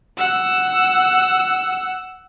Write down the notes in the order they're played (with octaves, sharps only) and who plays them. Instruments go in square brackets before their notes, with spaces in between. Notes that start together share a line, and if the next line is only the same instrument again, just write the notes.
[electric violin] F#5 E6